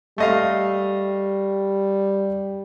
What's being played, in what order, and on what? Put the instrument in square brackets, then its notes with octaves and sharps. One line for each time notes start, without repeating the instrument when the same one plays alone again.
[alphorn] G3 [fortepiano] A3 D#5 F5